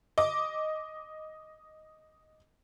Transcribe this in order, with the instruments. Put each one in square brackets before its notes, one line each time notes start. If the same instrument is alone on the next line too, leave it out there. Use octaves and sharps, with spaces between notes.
[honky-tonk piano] D#5 D6